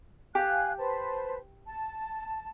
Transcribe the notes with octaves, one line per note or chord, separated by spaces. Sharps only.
G4 F5 G#5 F#6
B4 C5 A5
A5